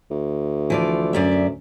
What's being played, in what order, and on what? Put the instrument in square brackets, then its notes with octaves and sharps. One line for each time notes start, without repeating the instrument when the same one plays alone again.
[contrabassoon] D2
[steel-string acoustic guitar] E3 F3 D5
F#2 D5 E5